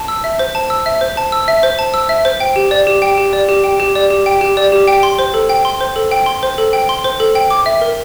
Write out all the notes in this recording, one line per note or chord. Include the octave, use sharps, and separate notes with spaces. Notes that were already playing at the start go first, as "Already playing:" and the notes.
Already playing: A5
E6
E5
C5
A5
E6
E5
C5
A5
E6
E5
C5
A5
E6
E5
C5
G5
G4
D5
G4
G5
G4
D5
G4
G5
G4
D5
G4
G5
G4
D5
G4
G5
C6
C5
A4
G5
C6
C5
A4
G5
C6
C5
A4
G5
C6
C5
A4
G5
D6
E5
A#4